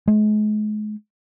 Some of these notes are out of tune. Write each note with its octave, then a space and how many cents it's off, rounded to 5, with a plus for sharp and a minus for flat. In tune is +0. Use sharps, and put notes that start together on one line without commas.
G#3 +40